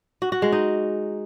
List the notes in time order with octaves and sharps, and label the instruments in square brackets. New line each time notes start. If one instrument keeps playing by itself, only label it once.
[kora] F#4
F#4
G#3
D#4